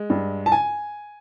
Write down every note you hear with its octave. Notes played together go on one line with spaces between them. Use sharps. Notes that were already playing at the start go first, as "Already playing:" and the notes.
Already playing: G#3
G2
A5
G#5